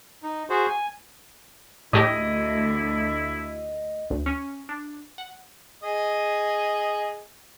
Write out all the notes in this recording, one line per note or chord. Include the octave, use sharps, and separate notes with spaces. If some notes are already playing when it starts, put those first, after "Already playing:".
D#4
F#4 G#4 C5
G#5
D2 A2 E4 G4 D#5
D2
C#4
D4
F#5
G#4 D#5